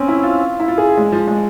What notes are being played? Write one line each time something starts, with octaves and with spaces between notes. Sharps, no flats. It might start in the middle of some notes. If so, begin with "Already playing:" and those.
Already playing: C4 C#4
E4
F4
E4
F4
G#4
G#3
F3
G#3